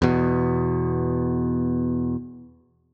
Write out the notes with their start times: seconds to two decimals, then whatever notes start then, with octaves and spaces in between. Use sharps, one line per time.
0.02 E2 B2